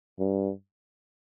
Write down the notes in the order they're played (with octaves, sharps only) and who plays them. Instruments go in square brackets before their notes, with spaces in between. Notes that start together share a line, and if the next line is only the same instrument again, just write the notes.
[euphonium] G2